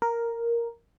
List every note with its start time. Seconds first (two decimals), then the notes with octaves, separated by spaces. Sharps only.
0.02 A#4